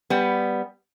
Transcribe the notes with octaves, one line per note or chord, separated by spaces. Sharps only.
G3 B3